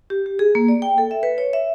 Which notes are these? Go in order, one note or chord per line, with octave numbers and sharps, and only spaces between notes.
G4
G4
G#4
A#3
D5
G5
A4
E5
B4
C#5
E5